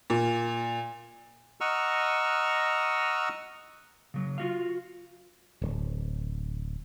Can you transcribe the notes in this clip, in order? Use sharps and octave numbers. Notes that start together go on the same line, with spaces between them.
A#2
D#5 F#5 A#5 C#6 E6 F6
C#3 F#3
F4 F#4 F5
D1